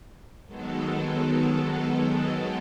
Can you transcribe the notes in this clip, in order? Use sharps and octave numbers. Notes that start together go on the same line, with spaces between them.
D#3 F#3 G#3 B3 A4